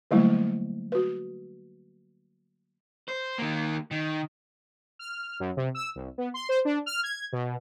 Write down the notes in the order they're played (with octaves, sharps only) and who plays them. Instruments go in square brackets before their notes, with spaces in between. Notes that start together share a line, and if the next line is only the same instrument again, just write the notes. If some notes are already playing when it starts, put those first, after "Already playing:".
[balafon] D3 F#3 G3 A3 A#3 E4
F#4 B4
[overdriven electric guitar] C5
D#3 A#3
D#3
[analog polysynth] F6
F#2
C3
E6
C2
B3
C6
C5
D4
F6
G#6
B2